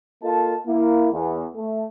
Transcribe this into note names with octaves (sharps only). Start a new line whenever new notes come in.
A#3 F4 A4 D#5 A5
A#3 E4
E2
A3